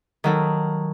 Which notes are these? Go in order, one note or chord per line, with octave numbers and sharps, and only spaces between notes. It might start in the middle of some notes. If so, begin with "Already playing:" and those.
D#3 F#3 A4